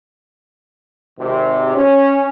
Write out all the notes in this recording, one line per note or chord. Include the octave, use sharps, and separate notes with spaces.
G#1 C3
C#4